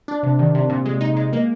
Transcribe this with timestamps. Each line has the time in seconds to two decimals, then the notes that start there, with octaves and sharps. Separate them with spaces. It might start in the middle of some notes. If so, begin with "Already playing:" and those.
0.08 D4
0.23 C3
0.39 D#3
0.55 C3
0.70 A#2
0.85 G#3
1.01 D#4
1.17 G#3
1.33 A#3